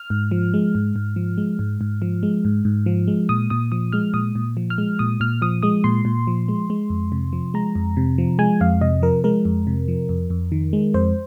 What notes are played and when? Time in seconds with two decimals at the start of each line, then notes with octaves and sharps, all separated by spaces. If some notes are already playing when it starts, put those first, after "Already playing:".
Already playing: F6
0.10 G#2
0.31 F3
0.54 G#3
0.75 G#2
0.96 G#2
1.16 F3
1.38 G#3
1.59 G#2
1.81 G#2
2.02 F3
2.23 G#3
2.45 G#2
2.65 G#2
2.86 F3
3.07 G#3
3.29 A#2 D#6
3.50 A#2 D#6
3.72 F3 D#6
3.92 G#3 F6
4.14 A#2 D#6
4.35 A#2
4.57 F3
4.70 F6
4.78 G#3
4.99 A#2 D#6
5.20 A#2 F6
5.42 F3 D#6
5.63 G#3 D#6
5.84 A#2 C6
6.05 A#2
6.27 F3
6.48 G#3
6.70 G#3
6.90 F2
7.12 C3
7.33 F3
7.54 G#3 A#5
7.75 F2
7.97 C3
8.18 F3
8.39 G#3 G#5
8.61 F2 F5
8.81 C3 D#5
9.02 F3 A#4
9.24 G#3 A#4
9.45 F2
9.67 C3
9.88 F3
10.09 F2
10.30 F2
10.52 D#3
10.73 G#3
10.94 F2 C5